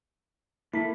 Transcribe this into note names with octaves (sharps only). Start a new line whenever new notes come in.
A#3 E4 A4 B5